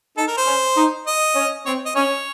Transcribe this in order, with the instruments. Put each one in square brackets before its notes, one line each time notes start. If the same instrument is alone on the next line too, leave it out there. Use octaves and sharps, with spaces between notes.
[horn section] D#4 [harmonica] A4
[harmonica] A#4
C5
[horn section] C#4
D#4
[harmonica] D#5
[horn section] C#4
[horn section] C4 [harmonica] C#5
[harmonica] D#5
[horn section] C#4 [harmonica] C#5